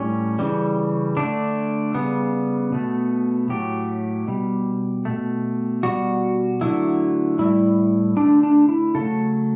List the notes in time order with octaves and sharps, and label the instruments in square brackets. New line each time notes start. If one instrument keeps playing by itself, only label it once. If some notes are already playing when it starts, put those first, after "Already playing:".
Already playing: [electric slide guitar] A2 G3 C#4
C#3 E3 G3
D3 A3 D4
C#3 G3 B3
B2 A3
A2 F#3 A3 G4
B2 G3
B2 A3
B2 G3 F#4
D3 F#3 A3 E4
A2 G3 E4
D3 A3 D4
D4
E4
C#3 F#3 A3 A4